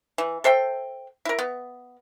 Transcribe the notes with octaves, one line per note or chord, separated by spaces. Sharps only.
E3
A4 C5 E5 G5
E4 A#4
B3